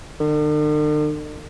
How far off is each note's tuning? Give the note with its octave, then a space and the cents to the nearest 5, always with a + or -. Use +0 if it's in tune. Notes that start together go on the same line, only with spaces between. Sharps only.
D3 +45